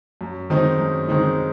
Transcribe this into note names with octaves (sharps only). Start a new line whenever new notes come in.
F#2
D#3 G#3 C4 D#4
F#2
D#3 G#3 C4 D#4